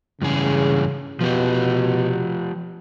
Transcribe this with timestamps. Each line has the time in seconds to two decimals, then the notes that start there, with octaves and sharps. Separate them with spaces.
0.22 G2 C#3 E3 G#4
1.21 B2 F3 G4